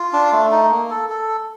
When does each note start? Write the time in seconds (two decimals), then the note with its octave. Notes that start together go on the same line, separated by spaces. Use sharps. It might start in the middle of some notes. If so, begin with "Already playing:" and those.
Already playing: F4
0.13 D4
0.32 A3
0.51 D#4
0.71 A#3
0.90 A4
1.10 A4